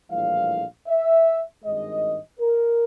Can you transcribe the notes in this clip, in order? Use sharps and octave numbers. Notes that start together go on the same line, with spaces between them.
A#1 A2 E3 G3 F5
E5
G#1 G2 D#3 G#3 D#5
A#4